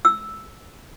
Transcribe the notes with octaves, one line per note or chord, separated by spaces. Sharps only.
E6